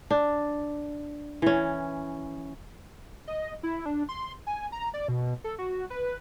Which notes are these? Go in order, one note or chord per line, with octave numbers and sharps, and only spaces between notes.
D4
E3 C#4
D#5
E4
D4
C6
G#5
A#5
D5
B2
A4
F#4
B4